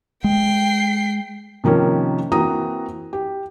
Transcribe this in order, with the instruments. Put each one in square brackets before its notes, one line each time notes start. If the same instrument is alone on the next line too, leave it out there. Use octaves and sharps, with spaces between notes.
[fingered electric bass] G#3 [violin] G5 C7
[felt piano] C3 D#3 F3 A#3 C#4
E3 A#3 C4 F#4 A#5 D#6
G4